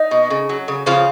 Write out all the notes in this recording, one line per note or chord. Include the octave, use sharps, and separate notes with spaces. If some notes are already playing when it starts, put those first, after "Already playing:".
Already playing: D#4
B2
C#3
F#3
C#3
C#3 F3 F4